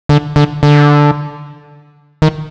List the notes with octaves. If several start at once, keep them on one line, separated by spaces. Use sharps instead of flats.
D3
D3
D3
D#3